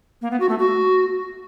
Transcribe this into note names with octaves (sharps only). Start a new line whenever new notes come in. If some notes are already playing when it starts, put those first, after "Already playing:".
A#3
B3
F#4
A3
F#4